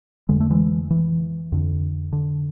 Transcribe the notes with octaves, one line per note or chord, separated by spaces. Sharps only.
F2 D3 G#3
A3
E3 G#3
E3
F2 D3
D3